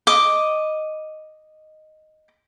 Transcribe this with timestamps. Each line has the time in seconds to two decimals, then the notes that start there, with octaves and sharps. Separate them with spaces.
0.07 D#5 D6